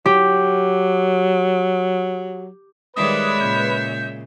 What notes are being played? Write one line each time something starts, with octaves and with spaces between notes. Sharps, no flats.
F#3 G4
D#3 G3 G#3 B4 C#5 D5 E5 D#6
A#2 C#3 G6